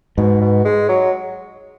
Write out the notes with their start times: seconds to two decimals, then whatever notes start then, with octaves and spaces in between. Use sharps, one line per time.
0.17 G#2 B2
0.41 B2
0.65 G#3
0.89 F#3